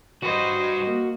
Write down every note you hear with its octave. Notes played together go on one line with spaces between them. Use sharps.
G3 F#4 B4 C5 D#5
A#3